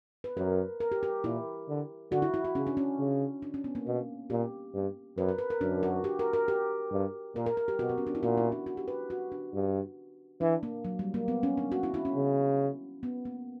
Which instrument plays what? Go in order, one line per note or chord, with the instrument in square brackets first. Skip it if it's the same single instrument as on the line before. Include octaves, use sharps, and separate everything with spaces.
[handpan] B4
[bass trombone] F#2 [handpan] A#4
[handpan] A#4
G4
G4
[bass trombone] A#2 [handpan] E4
[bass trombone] D3
[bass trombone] D3 [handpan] F#4
[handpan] E4
E4
F#4
[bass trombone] C#3 [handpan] C#4
[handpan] D4
C#4
[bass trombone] C#3
[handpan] D4
C#4
B3
A#3
[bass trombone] B2 [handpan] B3
[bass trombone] A#2 [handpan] G4
[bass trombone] G2
[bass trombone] F#2 [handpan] B4
[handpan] A#4
B4
A#4
[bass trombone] F#2 [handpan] D4
[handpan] F#4
G4
A#4
A#4
G4
[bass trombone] G2
[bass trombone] A#2 [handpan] A#4
[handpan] A#4
A#4
G4
[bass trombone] B2 [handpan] F#4
[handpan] B3
C#4
D4
E4
[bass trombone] A#2 [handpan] F#4
[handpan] E4
D4
F#4
G4
B4
F#4
D4
[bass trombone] G2
[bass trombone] E3 [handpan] D4
[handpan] A#3
F#3
G3
A#3
B3
C#4
D4
F#4
E4
E4
C#4
[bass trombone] C#3
[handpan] B3
A#3